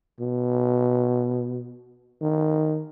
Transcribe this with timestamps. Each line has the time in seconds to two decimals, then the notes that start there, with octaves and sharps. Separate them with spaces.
0.20 B2
2.21 D#3